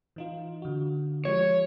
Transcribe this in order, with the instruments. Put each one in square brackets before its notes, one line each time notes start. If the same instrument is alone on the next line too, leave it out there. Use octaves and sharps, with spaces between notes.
[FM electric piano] E3 D#4 F4
D3 F#4
[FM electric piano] F3 G#3 G4 [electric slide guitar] C#5